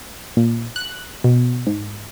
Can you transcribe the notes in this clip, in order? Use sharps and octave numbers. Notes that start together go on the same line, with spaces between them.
A#2
F#6
B2
G#2